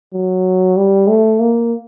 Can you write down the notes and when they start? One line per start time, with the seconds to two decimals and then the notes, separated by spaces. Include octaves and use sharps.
0.13 F#3
0.77 G3
1.08 A3
1.40 A#3